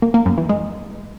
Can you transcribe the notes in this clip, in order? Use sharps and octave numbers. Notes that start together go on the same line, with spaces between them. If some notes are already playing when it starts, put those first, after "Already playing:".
A#3
A#3
F#2
E3
G#3